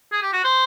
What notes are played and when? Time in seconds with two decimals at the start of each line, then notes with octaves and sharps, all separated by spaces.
0.12 G#4
0.22 G4
0.33 F#4
0.44 C5